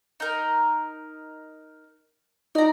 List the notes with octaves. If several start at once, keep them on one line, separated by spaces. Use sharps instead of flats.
D#4 A#4
D#4 D5 A#5